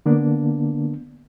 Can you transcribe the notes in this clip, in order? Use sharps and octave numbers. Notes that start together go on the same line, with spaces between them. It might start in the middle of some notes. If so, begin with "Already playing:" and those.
D3 A#3 B3 D4